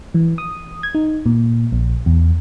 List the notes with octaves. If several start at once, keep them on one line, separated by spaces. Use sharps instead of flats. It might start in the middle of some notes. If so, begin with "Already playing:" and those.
E3
D#6
G#6
D#4
A#2
A#1
E2